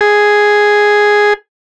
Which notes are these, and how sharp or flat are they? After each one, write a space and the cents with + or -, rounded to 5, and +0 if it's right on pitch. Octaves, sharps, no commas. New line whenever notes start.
G#4 +0